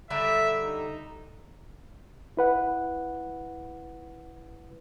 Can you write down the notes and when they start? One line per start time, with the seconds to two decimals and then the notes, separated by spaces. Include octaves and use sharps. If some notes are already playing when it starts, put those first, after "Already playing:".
0.10 D3 G3 E5 A#5
0.63 D#4
2.37 E4 B4 F#5